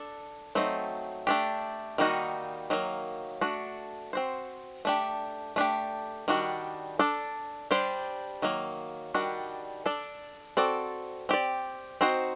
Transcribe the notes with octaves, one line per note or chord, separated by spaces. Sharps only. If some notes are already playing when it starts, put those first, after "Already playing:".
Already playing: D4 A4
F#3 A3 C4 D#4
A3 D4 G4
D#3 G3 A#3 D#4 F#4
D#3 F#3 A#3
A3 D4 F#4
C4 F#4 C5
A3 D4 G4
A3 D4 G4
D#3 G3 D4 F#4
D4 A4 D5
G3 D4 G4 C5
D#3 F#3 A#3
D#3 G3 D4 F#4
D4 A4 D5
C4 F#4 A4 D5
C4 G4 D5
C4 D#4 F#4 C5